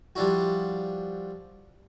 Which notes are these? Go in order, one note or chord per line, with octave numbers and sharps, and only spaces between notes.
F3 G3 D4 E4 F#4